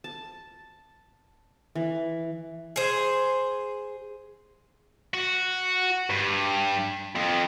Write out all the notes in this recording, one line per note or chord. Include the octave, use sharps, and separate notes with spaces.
A5
E3
G#4 C5
F#4
G2
F2